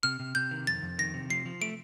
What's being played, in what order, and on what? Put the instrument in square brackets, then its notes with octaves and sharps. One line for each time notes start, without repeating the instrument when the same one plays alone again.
[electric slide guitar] C3 [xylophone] F6
[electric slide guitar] C3
[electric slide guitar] C3 [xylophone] G6
[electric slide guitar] D#3
[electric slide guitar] F2 [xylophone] A6
[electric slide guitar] F2
[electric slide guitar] D#3 [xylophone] A#6
[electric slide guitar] C3
[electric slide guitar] F3 [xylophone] C7
[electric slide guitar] F3
[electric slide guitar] A3 [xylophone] D7